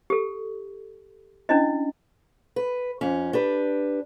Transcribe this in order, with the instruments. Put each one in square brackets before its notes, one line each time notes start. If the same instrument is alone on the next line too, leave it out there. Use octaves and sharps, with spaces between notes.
[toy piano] G4 A4
C#4 D4 E4 D#5
[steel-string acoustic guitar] B4
F2 C#4
D4 G4 B4